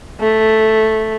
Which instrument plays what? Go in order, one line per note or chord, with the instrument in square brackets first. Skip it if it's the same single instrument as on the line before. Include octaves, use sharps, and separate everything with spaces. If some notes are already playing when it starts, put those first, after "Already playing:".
[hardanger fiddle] A3